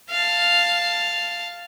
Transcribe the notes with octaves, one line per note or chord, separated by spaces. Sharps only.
F5 A5